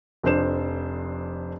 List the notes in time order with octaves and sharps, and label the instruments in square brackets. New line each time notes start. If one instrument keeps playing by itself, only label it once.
[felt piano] F1 F2 D4 C5 E7